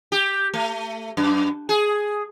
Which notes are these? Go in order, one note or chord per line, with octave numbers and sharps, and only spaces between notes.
G4
A3
F#2
G#4